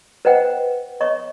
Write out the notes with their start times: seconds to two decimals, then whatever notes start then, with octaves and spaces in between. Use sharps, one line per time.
0.25 B4 C5 D#5 F#5 G5
1.00 C#5 D#5 C#6